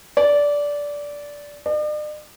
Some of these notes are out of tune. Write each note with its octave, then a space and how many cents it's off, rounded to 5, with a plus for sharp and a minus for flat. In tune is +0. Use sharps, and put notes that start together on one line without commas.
D5 -15
D5 +45